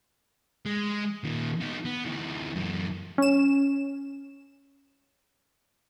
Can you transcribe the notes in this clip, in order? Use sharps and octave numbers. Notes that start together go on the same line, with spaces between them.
G#3
A#2 D#3
B3 D#4
B3
D2 E3
F#2 E3
C#4 E7